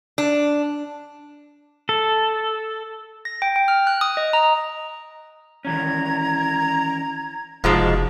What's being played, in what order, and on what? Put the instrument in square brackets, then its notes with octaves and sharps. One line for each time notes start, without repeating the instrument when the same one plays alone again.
[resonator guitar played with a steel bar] D4
[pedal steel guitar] A4
[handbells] A#6
G5
G5
F6
F#6
D#6
D#5
A#5
[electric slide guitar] D#3 E3 C#4 [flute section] A#5 G#6
[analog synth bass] F1 [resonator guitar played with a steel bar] G#2 F3 G#3 [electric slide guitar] C#3 F#4 A5